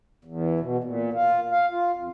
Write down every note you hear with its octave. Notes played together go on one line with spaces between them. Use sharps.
E2
B2
A#2
F4
F5
F4
F2